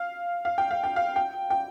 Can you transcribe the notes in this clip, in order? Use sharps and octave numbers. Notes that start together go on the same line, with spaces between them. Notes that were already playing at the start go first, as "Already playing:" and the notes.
Already playing: F5
F5
G5
F5
G5
F5
G5
G5